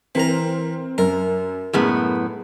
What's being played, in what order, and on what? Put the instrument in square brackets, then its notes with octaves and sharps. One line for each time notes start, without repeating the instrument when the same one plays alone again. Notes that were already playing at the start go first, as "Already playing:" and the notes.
[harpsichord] E3 A#5 [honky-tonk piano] C4 A#4
[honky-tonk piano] F#2 [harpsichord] A#4
[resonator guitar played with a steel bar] F#2 A2 B3 [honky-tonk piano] G#3